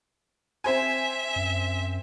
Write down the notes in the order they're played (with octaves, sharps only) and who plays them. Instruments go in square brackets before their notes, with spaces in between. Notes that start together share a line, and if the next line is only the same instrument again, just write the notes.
[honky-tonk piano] C4 C5 G#5 [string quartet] E5
[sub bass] F#2